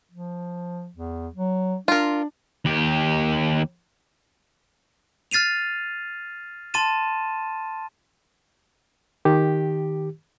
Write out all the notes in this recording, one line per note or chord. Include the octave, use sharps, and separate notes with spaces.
F3
E2
F#3
D4 F4 A#4
D#2 G4
F6 A6 C7 D#7 F7
A5 C6 A6 D#7 E7
D#3 G4